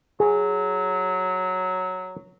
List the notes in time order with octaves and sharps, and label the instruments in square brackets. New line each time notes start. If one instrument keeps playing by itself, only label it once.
[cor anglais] F#3 [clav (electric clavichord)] G#4